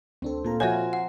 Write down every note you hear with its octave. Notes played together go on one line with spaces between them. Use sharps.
D2 C4 D4 A4
A#2 F4 A4 A#4 A#5
F3 F4 F#4 A#4 C#5 E5 G#5
F#5